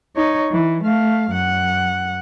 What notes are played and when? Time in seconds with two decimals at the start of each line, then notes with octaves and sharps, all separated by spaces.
0.16 D#4 C#5
0.52 E3
0.84 A3 F5
1.31 F#2 F#5